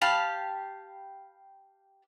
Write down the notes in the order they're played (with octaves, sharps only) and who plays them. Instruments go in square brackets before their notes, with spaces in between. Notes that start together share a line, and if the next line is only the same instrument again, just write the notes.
[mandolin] G4 F5 A5 B5